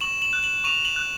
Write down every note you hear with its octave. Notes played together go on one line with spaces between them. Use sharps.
C#6 E7 F#7
E7 F#7
F#6
E7 F#7
C#6 D#7 F7
E7 F#7
F#6